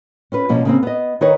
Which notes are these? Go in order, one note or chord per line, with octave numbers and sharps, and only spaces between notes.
C#4 F4 B4
B2 F3 A#3 C#4
C#3 A#3 C4
B3 D#5
D#3 D#4 A#4 B4 C#5